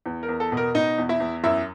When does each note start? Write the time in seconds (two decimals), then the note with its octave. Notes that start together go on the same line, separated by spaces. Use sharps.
0.06 E2
0.23 A#4
0.29 E2
0.40 A4
0.52 B2
0.57 A#4
0.75 B2 D#4 D#5
0.98 E2
1.09 E4 E5
1.20 E2
1.44 F#2 E4 E5